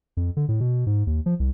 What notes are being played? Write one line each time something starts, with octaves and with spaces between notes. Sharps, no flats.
F2
D3
A2
B2
G#2
D#2
F3
C2